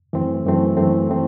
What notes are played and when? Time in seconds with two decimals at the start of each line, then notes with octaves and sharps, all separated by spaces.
0.13 F#2 E3 A3 C4
0.46 F#2 E3 A3 C4
0.77 F#2 E3 A3 C4
1.10 E3 A3 C4